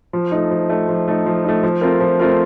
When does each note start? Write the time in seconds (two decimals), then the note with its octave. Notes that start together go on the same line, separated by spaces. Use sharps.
0.13 F3
0.32 A3 D#4
0.51 F3
0.69 A3 D#4
0.89 F3
1.08 A3 D#4
1.26 F3
1.45 A3 D#4
1.63 F3
1.81 A3 C4 F4 A#4
2.00 F3
2.19 A3 C4 F4 A#4